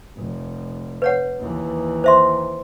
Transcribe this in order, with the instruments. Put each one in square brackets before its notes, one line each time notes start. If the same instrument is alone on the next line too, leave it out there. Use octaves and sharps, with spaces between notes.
[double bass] F1
[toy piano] B4 C#5 F#5
[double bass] D#2 E3
[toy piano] C5 E5 C6